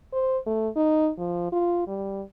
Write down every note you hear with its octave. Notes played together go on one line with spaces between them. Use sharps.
C5
A3
D#4
F3
F4
G3